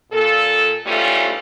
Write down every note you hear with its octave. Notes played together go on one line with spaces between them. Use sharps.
A#2 A4
G#2 E3 G3 A3 C#4 F4